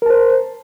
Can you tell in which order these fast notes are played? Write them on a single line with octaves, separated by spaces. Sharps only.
A#4 A5 C5